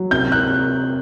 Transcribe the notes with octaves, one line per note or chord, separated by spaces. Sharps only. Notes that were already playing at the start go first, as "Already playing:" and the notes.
Already playing: F#3
C3 G6
F#6